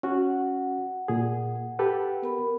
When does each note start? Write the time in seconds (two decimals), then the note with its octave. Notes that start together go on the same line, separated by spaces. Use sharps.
0.03 C#4 F#4 F#5
1.08 A#2 G#4
1.79 G4 A4 B4
2.22 B3 A#4 B5